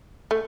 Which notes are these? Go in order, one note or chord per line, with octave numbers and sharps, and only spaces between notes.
A3